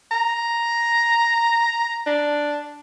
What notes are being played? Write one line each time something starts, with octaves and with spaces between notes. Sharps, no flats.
A#5
D4